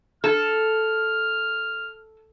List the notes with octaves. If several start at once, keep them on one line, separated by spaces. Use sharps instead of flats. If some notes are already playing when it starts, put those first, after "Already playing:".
A4 F6